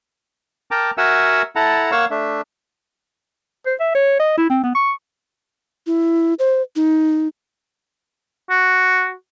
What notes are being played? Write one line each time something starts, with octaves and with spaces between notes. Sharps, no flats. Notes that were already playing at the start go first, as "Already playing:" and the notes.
A#4 G5 A5 A#5 D6
F#4 A#4 E5 F#5 G#5 E6
E4 A4 F#5 A5 A#5
A#3 C#5 F5 F#5 C#6 E6
A3 D4 E5
C5
E5
C#5
D#5
E4
C4
B3
C#6
E4
C5
D#4
F#4